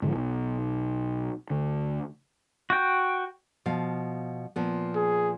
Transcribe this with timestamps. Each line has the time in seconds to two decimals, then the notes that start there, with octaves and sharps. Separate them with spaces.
0.02 G#2 D3 E3 F3
0.16 B1
1.50 D2 D3
2.70 F#4 G5
3.66 B2 F3 F5
4.56 A#2 F3 B3
4.95 G#4